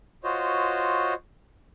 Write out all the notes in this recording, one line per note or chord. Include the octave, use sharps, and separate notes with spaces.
F4 F#4 C5 C#5 D#5